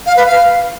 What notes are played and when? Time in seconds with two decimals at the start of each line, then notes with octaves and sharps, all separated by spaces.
0.06 F5
0.17 B4
0.27 F5